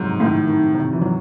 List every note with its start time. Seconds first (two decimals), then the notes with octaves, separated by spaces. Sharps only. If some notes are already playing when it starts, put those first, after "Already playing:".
Already playing: F2 G#2 C3 F#3
0.20 A2 D#3
0.48 D#3
0.74 C3
0.93 E3
1.02 F#3